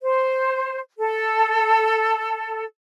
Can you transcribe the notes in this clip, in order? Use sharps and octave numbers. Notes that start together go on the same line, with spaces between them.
C5
A4